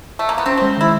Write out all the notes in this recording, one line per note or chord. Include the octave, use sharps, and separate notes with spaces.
A3
A#3
B3
C4 C#4
G#3 C4
D#3 E4